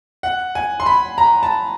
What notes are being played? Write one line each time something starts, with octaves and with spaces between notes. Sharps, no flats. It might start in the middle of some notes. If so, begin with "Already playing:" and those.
F#5
G#5
C6
B5
A#5
A5